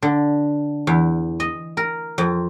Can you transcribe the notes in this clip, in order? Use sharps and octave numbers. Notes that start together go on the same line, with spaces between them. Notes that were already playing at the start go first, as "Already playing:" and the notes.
D3
E2
D#5
A#4
F2